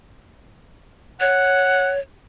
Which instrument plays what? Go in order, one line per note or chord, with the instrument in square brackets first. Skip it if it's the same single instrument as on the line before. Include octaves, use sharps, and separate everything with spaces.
[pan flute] C#5 [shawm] F#5